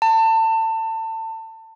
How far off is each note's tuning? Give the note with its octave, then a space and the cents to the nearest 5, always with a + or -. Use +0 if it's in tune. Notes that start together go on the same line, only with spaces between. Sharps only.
A5 +30